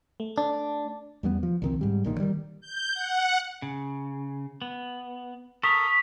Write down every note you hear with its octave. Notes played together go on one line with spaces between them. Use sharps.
A3
D4
E2 G3 A3 B3
F3
C2 D#3 C4
G#2 G3
A#1 A#2 D#3
D#3 G3
G6
F#5
C#3
B3
A4 A#4 C#6 D#6 B6